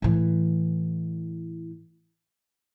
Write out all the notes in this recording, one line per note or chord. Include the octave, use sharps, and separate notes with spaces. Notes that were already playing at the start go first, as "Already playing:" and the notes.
A2 E3